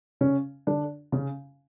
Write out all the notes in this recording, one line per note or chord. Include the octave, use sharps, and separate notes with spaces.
C#3 C#4
D3 D4
C#3 C#4